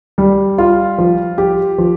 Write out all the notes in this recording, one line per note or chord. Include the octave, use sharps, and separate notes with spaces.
G3
F4
F3
G4
F3